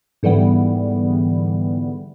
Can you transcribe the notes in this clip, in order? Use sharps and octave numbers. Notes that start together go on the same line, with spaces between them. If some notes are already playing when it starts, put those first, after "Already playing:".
G#2 D3 E3 G3 B3